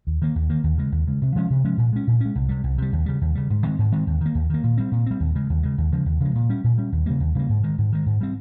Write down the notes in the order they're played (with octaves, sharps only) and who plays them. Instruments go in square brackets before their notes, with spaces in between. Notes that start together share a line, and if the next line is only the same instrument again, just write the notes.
[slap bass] D#2
D#3 A#3
D#2
D#3 A#3
D#2
C#3 G#3
D#2
C#3 G#3
C3
F3 G#3 C#4
C3
F3 G#3 C#4
A#2
G#3 C#4
A#2
G#3 C#4
C2
C3 G3
C2
C3 G3
D#2
C#3 G3
D#2
C#3 G3
G#2
D#3 G#3 C4
G#2
D#3 G#3 C4
D#2
D#3 A#3
D#2
D#3 A#3
A#2
G3 C4
A#2
G3 C4
D#2
C#3 G#3
D#2
C#3 G#3
D#2
C#3 F3 G#3
D#2
C#3 F3 G#3
A#2
G3 C#4
A#2
G3 C#4
D#2
C#3 G3 A#3
D#2
C#3 G3 A#3
G#2
D#3 G#3
G#2
D#3 G#3
G#2
G3 C4